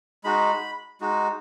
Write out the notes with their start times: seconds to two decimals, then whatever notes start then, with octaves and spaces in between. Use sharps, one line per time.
0.24 G#3 D#4 F#4 B5
1.01 G#3 D#4 F#4